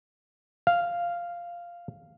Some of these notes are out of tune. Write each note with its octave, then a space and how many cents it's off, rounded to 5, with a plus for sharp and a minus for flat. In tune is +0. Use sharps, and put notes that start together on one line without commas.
F5 -5